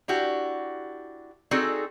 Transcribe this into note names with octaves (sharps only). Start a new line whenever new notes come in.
D4 E4 F#4 G4
C4 D#4 F#4 G#4 A4 D5